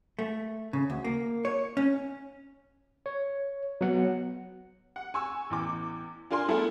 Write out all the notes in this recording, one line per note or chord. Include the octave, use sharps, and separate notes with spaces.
A3
C#3
D2
A#3
C#5
C#4
C#5
F#3 B3 F#5
F#5
G#5 C#6 E6
A1 E2 D6
D4 F4 A#4 G#5 C6
G#3 A3 B3 E4 F4 A4